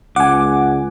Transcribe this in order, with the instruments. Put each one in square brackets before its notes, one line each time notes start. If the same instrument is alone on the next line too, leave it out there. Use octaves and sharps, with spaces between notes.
[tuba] C#2 [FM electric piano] F#5 G#5 [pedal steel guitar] D6